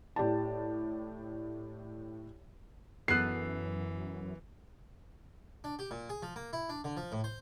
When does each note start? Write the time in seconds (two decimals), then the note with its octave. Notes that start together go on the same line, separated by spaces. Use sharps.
0.16 A2 G4 D5 A5
3.08 F#2 E3 B3 A4 F#6 C7
5.64 D4
5.79 G4
5.91 A#2
6.09 G#4
6.23 F3
6.36 A#3
6.53 E4
6.69 D4
6.84 D3
6.97 F3
7.12 A2
7.24 C5